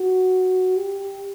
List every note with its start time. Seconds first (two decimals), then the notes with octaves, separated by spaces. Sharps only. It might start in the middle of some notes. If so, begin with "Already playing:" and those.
Already playing: F#4
0.76 G4